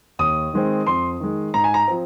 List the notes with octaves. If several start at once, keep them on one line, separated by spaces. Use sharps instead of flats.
D#2 D#6
D#3 G#3 C4
F2 C6
D#3 G#3
G#2 A#5
G#5
A#5
F3 C4